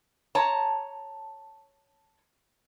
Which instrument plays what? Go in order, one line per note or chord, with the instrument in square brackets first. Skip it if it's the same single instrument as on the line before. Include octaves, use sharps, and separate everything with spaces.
[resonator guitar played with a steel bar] C#5 A5 A#5